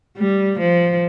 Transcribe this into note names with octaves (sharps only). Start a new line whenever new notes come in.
G3
F3